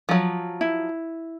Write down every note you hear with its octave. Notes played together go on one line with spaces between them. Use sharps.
F3 F#3
E4